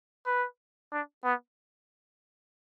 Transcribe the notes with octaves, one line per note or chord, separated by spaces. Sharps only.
B4
D4
B3